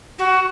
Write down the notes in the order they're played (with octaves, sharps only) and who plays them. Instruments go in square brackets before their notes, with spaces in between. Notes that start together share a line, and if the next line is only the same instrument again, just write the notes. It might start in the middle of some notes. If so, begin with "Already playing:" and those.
[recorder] F#4